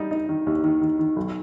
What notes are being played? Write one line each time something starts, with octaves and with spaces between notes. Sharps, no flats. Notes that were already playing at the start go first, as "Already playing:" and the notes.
Already playing: G3 D#4
D#4
D#3
D#2
D#3
D#3
D#3
B1